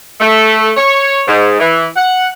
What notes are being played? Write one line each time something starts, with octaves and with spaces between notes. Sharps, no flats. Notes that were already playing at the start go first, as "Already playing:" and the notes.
A3
C#5
G#2
E3
F#5